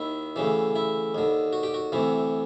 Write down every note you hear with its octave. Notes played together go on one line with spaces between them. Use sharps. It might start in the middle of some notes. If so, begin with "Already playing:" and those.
Already playing: D#2 D#3 E4
D2 C#3 E3
E4
D#2 D3
F#4
G4
F#4
D2 C3 E3